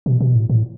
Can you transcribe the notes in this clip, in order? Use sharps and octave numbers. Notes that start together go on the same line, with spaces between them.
B2
B2
A2
A2